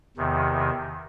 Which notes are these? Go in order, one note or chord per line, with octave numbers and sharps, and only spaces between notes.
E2 C3 D#3